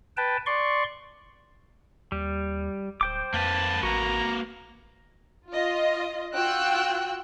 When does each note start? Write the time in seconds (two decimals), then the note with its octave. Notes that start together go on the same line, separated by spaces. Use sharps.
0.17 B4 G5 A5
0.46 D5 C6 C#6
2.12 D#2 G3
3.01 D1 C5 G5 D6
3.34 F2 A#3 B4 A5
3.83 A1 F#4 A#5
5.52 F4 D#5
6.35 F4 F#4 G5 E6 F#6